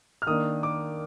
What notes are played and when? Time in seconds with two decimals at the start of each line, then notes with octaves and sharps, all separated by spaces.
0.22 F6
0.27 D#3 A#3 D4 D#6
0.63 D6